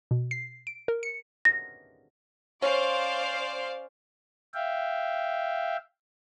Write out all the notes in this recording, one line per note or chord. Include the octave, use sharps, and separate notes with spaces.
B2
C7
D7
A#4
C#7
A#6
C#4 C5 D5 F5
E5 F5 G5